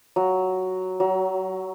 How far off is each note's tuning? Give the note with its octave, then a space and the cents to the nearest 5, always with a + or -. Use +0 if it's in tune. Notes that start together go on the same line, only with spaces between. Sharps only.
F#3 +5
F#3 +30